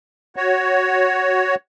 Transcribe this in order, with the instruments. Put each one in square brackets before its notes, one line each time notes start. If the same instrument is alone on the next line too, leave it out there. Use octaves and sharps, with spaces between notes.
[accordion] F#4 C#5